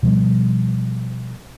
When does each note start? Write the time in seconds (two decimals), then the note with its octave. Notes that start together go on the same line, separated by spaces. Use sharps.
0.03 B2 F3 G3 B3